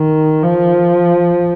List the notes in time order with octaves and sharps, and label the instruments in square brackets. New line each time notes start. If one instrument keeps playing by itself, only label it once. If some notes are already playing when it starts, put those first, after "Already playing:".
Already playing: [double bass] D#3
F3